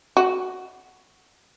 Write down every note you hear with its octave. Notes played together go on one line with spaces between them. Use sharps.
F#4